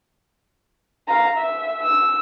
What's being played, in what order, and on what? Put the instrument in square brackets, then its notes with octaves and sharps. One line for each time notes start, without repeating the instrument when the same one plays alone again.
[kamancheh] F5 A#5
E5
E6